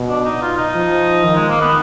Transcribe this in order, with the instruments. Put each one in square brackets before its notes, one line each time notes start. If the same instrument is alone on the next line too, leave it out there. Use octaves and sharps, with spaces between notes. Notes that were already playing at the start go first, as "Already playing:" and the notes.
Already playing: [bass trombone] B2
[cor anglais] D4
D#4
F4
D#4
[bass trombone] F3
D#3
[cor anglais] G#3
A#3
B3